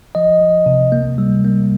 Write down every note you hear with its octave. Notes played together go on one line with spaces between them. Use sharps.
F3 D#5
F3
C3
A#3
G3
A#3